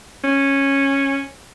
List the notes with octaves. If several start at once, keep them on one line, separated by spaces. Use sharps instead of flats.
C#4